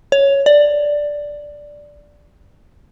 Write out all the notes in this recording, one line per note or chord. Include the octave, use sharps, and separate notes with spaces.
C#5
D5